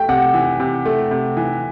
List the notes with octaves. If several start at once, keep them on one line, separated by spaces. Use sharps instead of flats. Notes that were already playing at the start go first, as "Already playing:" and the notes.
Already playing: A3 G5
C3 F#5
E3
C3
A3
C3
E3